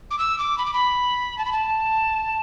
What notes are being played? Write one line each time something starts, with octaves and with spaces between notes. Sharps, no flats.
D6
E6
D6
B5
D6
B5
A5
B5
A5